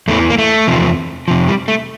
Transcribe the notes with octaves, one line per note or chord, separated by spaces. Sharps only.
E2 E3 A3
A#3
A3
E2 C3 F3
F2 C3 F3
G3
A3